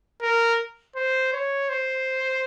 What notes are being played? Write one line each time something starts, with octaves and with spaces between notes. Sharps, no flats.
A#4
C5
C#5
C5